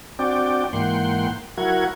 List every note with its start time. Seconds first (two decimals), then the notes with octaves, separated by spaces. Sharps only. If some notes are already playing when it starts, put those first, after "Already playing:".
0.19 C4 D4 F#4 D5 G5
0.73 G#2 E3 A#3 F#5 G5 C6
1.58 F#3 E4 F#4 A#4 F#5 G#6